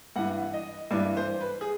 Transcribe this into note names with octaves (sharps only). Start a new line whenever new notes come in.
G2 E3 F#5
D#5
G2 E3 D5
C5
B4
G#4